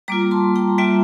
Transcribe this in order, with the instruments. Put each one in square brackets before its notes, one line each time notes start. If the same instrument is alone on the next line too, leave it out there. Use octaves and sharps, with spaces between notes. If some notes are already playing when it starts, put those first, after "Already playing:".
[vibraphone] G3 A#3 F4 A#5 D6
A5 C6
G5 A#5
G3 A#3 F4 E5 G5